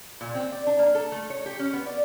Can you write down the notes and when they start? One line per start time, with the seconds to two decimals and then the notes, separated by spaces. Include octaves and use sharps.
0.21 A#2
0.35 C4
0.52 D5
0.67 D4
0.79 A#3
0.95 A4
1.12 A3
1.30 C#5
1.46 G4
1.59 C#4
1.73 B3
1.86 D5